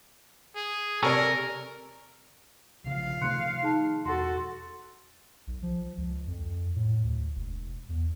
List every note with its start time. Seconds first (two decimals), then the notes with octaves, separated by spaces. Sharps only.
0.55 G#4
1.03 C3 A4 A#4 C#5 D5 G#5
2.84 B1 C#3 F3 F5
3.21 C3 D#3 A3 C6 F#6 C#7
3.63 D#4 G#4 A5
4.05 E1 F#4 A4 C6
5.47 B1
5.62 F3
5.97 C#2
6.27 F2
6.76 A2
7.04 D2
7.36 E1
7.89 E2